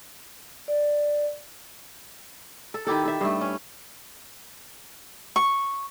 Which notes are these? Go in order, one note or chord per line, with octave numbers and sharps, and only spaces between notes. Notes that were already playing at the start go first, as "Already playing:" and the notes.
D5
A4
D#3 E4 G4 A4
A4 E5
G2 A3
C#4
C#6